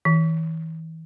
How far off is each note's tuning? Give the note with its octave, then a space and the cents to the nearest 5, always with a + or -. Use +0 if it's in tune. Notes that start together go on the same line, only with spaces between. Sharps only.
E3 -35